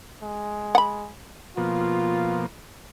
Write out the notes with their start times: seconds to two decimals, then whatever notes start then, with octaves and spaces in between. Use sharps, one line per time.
0.23 G#3
0.75 F#5 B5
1.57 B2 F3 A#3 F4